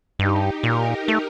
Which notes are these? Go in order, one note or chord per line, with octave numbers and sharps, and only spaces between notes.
G2 D#4 G4
A#2 G4 A#4
A3